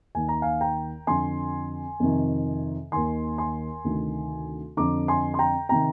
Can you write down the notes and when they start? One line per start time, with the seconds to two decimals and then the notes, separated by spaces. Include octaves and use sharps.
0.15 D#2 D#3 G#5
0.29 A#5
0.42 F5 G#5
0.61 G5 A#5
1.07 F2 D3 G#5 C6
2.00 F2 C3 D#3
2.92 D#2 D#3 G#5 C6
3.38 G#5 C6
3.85 D2 C3 D#3
4.77 F2 D3 A#5 D6
5.08 G#5 C6
5.34 C6
5.39 G5 A#5
5.69 C3 D#3 G5 A#5